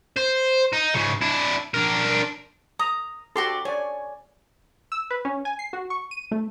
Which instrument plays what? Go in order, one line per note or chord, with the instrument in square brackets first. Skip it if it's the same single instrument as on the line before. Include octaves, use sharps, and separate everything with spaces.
[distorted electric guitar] C5
D#4
G#2 C#3
D4 E4
D4 A#4
[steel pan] A#5 [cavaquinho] D#6
[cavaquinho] F#4 G4 D5 [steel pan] A4 C6
[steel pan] C#5 D5 [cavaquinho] G#5
[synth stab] E6
B4
C#4
G#5
C7
F#4
C#6
D#7
A3